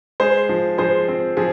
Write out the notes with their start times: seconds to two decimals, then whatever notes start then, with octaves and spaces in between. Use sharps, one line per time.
0.20 G#3 G#4 C5
0.49 F3
0.78 F3 G#4 C5
1.08 C4
1.37 F3 G#4